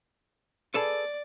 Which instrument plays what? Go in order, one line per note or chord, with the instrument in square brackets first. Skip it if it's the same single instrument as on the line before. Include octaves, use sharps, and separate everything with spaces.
[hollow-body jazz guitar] G#4 A4 B4 [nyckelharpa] D5